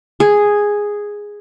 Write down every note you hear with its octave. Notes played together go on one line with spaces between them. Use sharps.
G#4